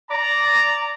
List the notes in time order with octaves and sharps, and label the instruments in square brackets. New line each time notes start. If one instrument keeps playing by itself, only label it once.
[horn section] D5 A#5